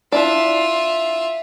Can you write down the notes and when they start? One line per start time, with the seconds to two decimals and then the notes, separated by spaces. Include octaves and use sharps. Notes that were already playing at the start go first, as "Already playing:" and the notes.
0.12 D4 E4 F4 D5 E5